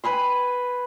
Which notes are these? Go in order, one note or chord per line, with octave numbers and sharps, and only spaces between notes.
B4 G#5 B5 C6